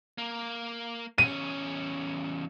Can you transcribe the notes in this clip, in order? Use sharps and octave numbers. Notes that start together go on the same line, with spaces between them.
A#3
E2 C#4 D#7